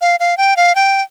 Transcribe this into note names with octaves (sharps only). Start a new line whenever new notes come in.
F5
F5
G5
F5
G5